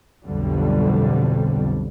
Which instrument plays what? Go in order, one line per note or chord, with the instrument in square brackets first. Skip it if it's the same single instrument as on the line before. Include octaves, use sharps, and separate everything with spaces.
[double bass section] B1 F2 D3 G3